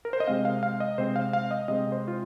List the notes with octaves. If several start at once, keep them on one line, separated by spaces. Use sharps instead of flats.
A#4
C5
D#5
C3 G#3 C4 F5
F5
F5
D#5
C3 G#3 C4 C5
F5
F5
D#5
C3 G#3 C4 D#5
C5
F4